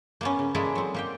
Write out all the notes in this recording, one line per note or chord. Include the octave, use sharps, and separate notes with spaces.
A#3 B3 C#4
C#3
G#3 A#3 E4 G#4 A4 D5
F#3 C4
A#3 G4 G5